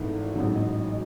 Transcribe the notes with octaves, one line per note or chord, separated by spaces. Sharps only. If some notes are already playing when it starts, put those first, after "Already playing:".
Already playing: G#1 G#2 E3 A3
A1 G#2 F#3
D#5
D#5